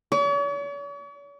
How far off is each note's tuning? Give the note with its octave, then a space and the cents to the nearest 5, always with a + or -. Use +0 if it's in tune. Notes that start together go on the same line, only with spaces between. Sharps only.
C#5 +45